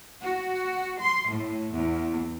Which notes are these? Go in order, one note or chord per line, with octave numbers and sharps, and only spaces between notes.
F#4
C6
A2
E2